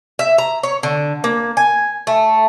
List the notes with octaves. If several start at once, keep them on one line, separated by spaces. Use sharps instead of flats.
E5
A#5
C#5
D3
A#3
G#5
A3